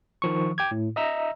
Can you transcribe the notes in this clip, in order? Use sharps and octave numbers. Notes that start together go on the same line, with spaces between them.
D#3 F3 C#6
G5 D6 G#6
A2
D#5 E5 A#5 E6